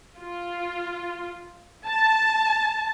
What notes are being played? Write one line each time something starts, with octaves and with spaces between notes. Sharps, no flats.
F4
A5